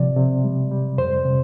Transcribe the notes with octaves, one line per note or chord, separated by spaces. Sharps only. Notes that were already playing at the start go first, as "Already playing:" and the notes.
Already playing: C3 F3 D5
C3
G3
G3
F2 C5
C3